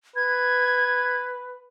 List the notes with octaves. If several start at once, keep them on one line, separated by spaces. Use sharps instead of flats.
B4 G#6